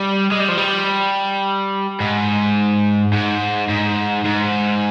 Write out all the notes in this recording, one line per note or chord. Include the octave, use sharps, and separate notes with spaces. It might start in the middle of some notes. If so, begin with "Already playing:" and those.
Already playing: G3
G#3
G3
F3
G3
G#2
G#2
G#2
G#2